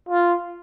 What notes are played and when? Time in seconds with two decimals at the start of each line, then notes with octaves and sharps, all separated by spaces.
0.09 F4